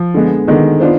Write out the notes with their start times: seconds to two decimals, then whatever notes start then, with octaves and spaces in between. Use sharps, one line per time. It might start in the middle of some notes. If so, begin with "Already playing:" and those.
Already playing: F3
0.14 D3 G#3 B3
0.47 D3 D#3 G#3 B3
0.80 B3 D4 F4 C5